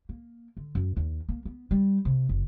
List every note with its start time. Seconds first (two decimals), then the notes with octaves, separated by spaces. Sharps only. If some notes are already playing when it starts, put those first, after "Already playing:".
0.09 A#3
0.57 D3
0.75 F#2
0.97 D#2
1.29 A#3
1.45 B3
1.71 G3
2.05 C3
2.29 F#1